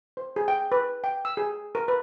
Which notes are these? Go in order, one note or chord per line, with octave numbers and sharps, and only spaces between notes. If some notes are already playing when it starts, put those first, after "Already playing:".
C5
G#4
G5
B4
G5
E6
G#4
A#4
B4